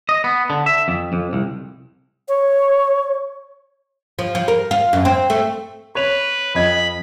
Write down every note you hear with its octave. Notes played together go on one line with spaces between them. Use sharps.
D#5
B3
D3
E5
F2
F2
C2
C#5
F3
F3
A#4
F4
F#2
C4
A3
B4 C#5 F7
F2 D#5 B5 G#6